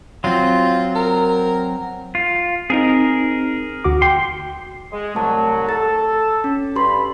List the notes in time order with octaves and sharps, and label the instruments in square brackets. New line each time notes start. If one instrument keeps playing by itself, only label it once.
[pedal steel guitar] F#3 C4 [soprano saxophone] F4
[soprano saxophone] A#4
[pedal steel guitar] F4
[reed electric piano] C4 D#4 [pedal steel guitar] G#4 A#4
[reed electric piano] D2 F#4 D6
[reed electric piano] G5 [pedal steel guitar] C6
[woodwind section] G#3
[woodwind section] C2 F#3 [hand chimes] A3 A5
[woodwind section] A4 [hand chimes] A6
[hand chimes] C#4
[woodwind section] G2 B5 [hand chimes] G4 C6